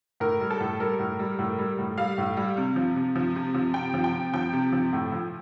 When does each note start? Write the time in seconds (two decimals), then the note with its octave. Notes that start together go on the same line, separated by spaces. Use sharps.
0.20 A2 A#4
0.40 G3
0.50 A4
0.60 A2
0.80 G3 A#4
0.99 A2
1.19 G3
1.39 A2
1.59 G3
1.79 A2
1.98 G3 F5
2.18 A2
2.37 G3
2.57 C3
2.76 F3
2.96 C3
3.16 F3
3.36 C3
3.54 F3
3.74 C3 G5
3.94 F3
4.04 G5
4.14 C3
4.34 F3 G5
4.53 C3
4.72 F3
4.93 A2
5.12 F3